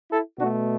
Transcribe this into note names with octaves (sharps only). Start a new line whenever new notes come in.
E4 A4
B2 A3 D4 F#4